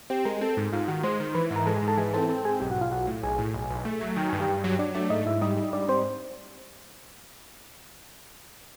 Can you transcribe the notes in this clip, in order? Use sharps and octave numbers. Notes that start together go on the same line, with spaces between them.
C4 G4 G5
G#3 A#4 A#5
C4 A4 A5
G#2
G#2 F4 F5
D#3 F#4 F#5
G#3 C5 C6
D#3
E3 B4 B5
G#2
A#4 A#5
G#3 A4 A5
G#4 G#5
G#2
A4 A5
E3 G#4 G#5
C4 A4 A5
C4 A4 A5
G#2 G#4 G#5
B1 G4 G5
F#4 F#5
B1
F4 F5
B1 F#4 F#5
A2
B1 G#4 G#5
A2
B1
B1
A3
F#3
D#3 G5
G2 G#5
G4 G5
G2
F#3
F#3 D4 D5
A3 D4 D5
G#2 D#4 D#5
G#2 E4 E5
G3 D#4 D#5
G3
G#2 D4 D5
G3 C4 C5